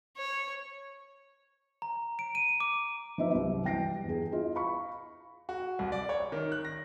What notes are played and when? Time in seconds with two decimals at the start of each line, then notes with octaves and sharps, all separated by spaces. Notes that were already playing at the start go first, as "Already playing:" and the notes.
0.17 C#5
1.82 A#5
2.19 D7
2.35 D#7
2.60 D6
3.18 F3 D#4 B4 D#5 E5
3.31 C2 F#2
3.64 E3 G3 G5 A#6 C7 D7
4.05 E2 G#4
4.32 E4 F4 D#5
4.55 F5 B5 C#6
5.49 F#4
5.79 C2
5.92 D5
6.09 C#5
6.32 D#3
6.52 F#6
6.65 A#6